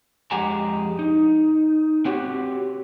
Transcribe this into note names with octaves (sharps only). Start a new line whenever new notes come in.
F2 G#3 G4 F#5 G#5 A#5
D#4
C4 F#4 G4 C#5